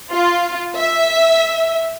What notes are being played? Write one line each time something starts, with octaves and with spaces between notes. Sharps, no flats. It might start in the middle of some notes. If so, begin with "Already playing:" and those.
F4
E5